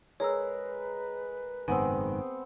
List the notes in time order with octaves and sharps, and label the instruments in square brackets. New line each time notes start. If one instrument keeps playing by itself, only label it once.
[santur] G#3 A#4 [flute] B4 [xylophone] C#5 E6
[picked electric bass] F#1 G#2 D#3 [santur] B3 C4 [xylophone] G#5